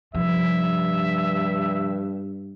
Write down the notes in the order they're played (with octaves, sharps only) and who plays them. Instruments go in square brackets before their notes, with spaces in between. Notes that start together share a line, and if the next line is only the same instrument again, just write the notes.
[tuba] G2 [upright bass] C3 F3 [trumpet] E5